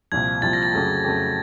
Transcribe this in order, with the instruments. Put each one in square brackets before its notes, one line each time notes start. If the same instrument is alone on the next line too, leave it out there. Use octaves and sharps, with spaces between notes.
[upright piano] C2 A#2 F3 [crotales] G#6
[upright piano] C2 A#2 F3 [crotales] A6
[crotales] A#6
A6
[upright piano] F2 C#3 F#3 A3
F2 C#3 F#3 A3